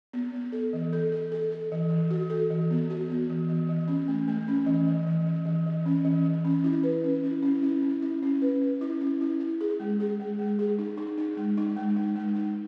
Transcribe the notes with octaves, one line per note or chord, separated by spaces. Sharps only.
B3
B3
A4
E3
A4
A4
A4
A4
E3
E3
F#4
A4
E3
B3
F#4
B3
E3
E3
E3
C#4
A3
A3
C#4
E3
E3
E3
E3
E3
E3
C#4
E3
E3
C#4
E4
B4
C#4
E4
C#4
E4
C#4
E4
C#4
B4
C#4
E4
C#4
E4
E4
G#4
G#3
G#4
G#3
G#3
G#4
D#4
D#4
D#4
G#3
D#4
G#3
D#4
G#3
D#4